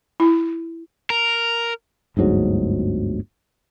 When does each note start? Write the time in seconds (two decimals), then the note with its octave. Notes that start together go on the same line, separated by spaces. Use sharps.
0.20 E4
1.10 A#4
2.17 G1 D2 G#2 F#3